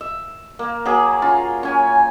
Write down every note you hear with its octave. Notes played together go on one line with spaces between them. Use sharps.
E5
A#3
F#3 A#3 G#4
C#4 F4
C#4 G#5